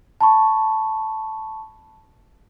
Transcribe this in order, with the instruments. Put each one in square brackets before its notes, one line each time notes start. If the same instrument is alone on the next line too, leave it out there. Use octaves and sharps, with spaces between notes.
[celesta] A5 B5 C#6